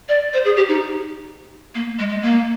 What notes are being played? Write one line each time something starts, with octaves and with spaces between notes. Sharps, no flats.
D5
C5
G#4
G4
D#4
A#3
G#3
G#3
A#3